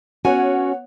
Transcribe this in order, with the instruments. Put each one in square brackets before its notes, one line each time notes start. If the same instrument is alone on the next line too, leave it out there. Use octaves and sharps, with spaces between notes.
[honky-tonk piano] B3 C#5 F#5 [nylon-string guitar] C#4 F#4 G#5